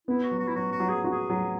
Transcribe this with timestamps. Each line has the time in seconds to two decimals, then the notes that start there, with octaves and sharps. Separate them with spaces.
0.08 B3 E4
0.23 F#4
0.31 F#3
0.40 F#4
0.48 E4
0.56 F#3 F#4
0.72 F#4
0.80 F#3
0.89 G#4
1.04 F#4
1.11 G#4
1.30 F#3